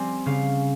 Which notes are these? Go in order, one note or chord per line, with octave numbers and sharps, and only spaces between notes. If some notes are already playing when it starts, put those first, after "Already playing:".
Already playing: G3 C4 G#5
C#3 F5